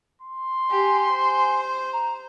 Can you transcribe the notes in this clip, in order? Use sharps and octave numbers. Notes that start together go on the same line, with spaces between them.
C6
G4 G#5
C5
A#5